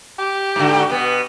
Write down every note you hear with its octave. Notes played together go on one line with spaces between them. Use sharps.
G4
G#2 D3
B2 B3